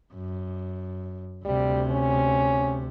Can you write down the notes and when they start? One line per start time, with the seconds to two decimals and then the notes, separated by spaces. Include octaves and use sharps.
0.14 F#2
1.45 D2 C3 G3
1.90 C#4